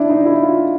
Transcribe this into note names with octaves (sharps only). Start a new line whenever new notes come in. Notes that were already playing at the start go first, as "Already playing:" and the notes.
Already playing: D4 E4
D#4
E4
F4